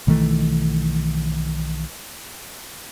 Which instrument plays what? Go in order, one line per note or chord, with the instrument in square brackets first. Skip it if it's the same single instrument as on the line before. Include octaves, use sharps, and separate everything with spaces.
[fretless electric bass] B1 D#3 E3 A3